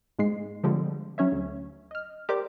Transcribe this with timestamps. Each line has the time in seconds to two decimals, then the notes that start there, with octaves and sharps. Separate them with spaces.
0.19 G#2 G#3 C7
0.64 D3 F3 G3 G#3 C4
1.18 F#3 C#4 C#5 E5
1.32 D2
1.91 D#5 F6
2.29 G4 A#4 C5 D5 D6